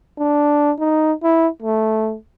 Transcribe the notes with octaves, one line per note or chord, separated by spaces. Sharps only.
D4
D#4
E4
A3